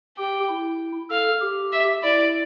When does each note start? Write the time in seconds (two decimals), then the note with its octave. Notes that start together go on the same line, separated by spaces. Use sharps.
0.18 G4 G5
0.49 E4
1.10 A4 F5
1.41 G4
1.72 E5
2.03 E4 D5